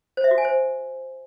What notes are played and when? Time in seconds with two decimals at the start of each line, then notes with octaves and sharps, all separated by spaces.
0.17 C5
0.24 E5
0.31 F#4
0.38 G#5
0.45 C5